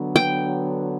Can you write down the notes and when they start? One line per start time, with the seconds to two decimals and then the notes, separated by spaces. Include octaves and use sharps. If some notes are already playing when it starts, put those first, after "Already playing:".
Already playing: D3 F#3 B3
0.16 G5